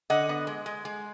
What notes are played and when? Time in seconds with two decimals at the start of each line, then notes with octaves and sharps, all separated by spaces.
0.10 D3 D#5 F#5
0.29 B3
0.47 G#3
0.66 G#3
0.85 G#3